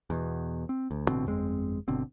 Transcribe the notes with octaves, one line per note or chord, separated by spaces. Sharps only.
E2 B2
C4
D2
A1 B2 D3 C4
G1 F2 G#3 C4
G1 B2 D3 C4